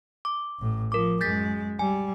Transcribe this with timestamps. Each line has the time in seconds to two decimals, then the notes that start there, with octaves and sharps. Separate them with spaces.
0.25 D6
0.59 A1 A2
0.92 F3 A#4 D6
1.21 F#2 G#3 G6 A6 B6
1.79 G3 G#5